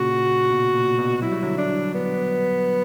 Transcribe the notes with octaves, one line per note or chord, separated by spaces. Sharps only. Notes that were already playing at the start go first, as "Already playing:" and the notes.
Already playing: A#2 C#3 F#4
B2
A#2
B2
F#3 E4
G3
D3 F#3
D4
B3